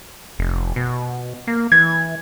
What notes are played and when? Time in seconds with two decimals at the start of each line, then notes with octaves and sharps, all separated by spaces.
0.39 F1
0.76 B2
1.47 A#3
1.72 E3 G#6